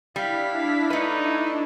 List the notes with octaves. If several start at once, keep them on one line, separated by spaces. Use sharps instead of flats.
G3 D4 E4 F5 B6
A3 D#4 B4